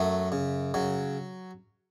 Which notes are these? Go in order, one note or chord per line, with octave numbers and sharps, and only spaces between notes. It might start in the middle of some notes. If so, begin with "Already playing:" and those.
Already playing: F#2 F#3 A3
C#3
C#3 F#3